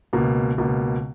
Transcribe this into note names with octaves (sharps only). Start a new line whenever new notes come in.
C#2 B2 A#3
C#2 B2 A#3